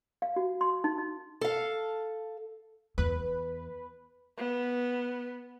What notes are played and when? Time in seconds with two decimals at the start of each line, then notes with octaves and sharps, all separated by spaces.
0.22 F5
0.36 F#4
0.61 C6
0.84 D#4
0.98 D#4
1.41 A4 F5
2.98 E2 B4
4.38 B3